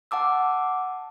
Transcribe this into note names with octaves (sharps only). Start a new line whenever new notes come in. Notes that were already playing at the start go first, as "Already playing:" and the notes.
F#5 A5 D6 E6